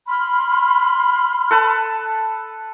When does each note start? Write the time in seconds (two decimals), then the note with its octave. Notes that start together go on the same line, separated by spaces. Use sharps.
0.08 B5 C6 F6
1.51 A4 B4 A5